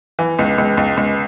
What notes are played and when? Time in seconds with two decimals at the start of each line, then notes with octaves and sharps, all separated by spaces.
0.19 E3
0.39 C#2
0.58 C#2
0.77 C#2
0.97 C#2